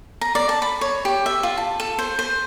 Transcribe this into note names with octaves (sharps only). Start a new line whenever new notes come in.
A#5
D5
A5
B5
C#5
G4
E5
F4
A5
A4
C5
C5